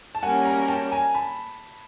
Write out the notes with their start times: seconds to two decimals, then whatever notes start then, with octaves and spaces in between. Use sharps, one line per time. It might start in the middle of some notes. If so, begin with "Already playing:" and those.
0.15 A5
0.22 G3 A#3 C#4 F#4 A#4 F#5 G#5
0.45 G#5 A#5
0.68 G5 A5
0.91 G#5 A#5
1.14 A5 B5